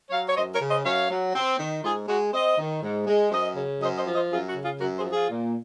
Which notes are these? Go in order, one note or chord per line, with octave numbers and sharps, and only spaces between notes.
F#3 C#5 F5
C#5
F#2 C5 D#5
A#4 C#5
C#3
C5 D#5
F#2 C#5 F5
F#3
C4
D#3
G#2 F4 G#4
G#3 F#4
C4 C5 D#5
D#3
G#2
G#3
F#2 C5 D#5
C#3
F#2 C5 D#5
C5 D#5
F3
C5 D#5
F#2 F4 G#4
F#4
C#3
F4 G#4
F#2 F#4 A#4
G#4 C5
F3
F4 G#4
A#2